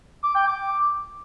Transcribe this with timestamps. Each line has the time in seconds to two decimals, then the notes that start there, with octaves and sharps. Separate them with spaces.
0.23 D6
0.35 G5
0.47 D6